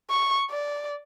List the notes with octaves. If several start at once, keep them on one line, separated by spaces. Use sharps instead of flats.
C#6
D5